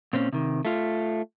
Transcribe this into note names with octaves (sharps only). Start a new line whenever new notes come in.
A#2 C4 C#4
C3 D#3
A3 F4